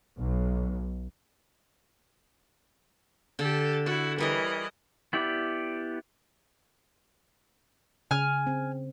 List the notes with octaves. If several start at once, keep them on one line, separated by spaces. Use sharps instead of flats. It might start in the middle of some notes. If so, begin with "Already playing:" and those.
B1
D3 G4 A4
E4 F#4 A4
E3 G3 A#4 C#5 D#5
B3 E4 G4 D5
C#3 G#5 F6
C4